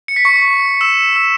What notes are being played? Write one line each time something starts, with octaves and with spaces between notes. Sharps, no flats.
C#7
B6
C#6 C#7
E6 E7
E6 E7